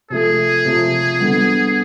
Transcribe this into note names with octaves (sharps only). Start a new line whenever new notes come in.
C3 F3 A3 G#4
C3 F3 A3
D3 G3 B3